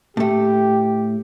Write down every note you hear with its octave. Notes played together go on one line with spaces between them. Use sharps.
A2 A3 G4